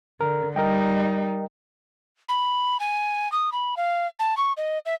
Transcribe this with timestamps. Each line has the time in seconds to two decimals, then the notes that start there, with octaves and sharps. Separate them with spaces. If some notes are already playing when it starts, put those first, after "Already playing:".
0.21 D3 A#4
0.56 G3 D#4 A#4 D#5 G5
2.29 B5
2.80 G#5
3.32 D#6
3.52 B5
3.77 F5
4.19 A5
4.37 C#6
4.57 D#5
4.86 E5